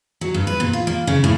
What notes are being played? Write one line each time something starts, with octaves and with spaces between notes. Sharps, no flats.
F#3
G2
B4
A#2
F4
A#3
C#3
A2